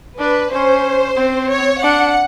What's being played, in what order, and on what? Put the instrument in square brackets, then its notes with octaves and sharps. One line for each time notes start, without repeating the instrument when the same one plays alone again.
[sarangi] D4 [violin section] B4
[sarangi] C#4 [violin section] C5
[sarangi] C4
[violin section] C#5
[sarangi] D4 [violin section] F#5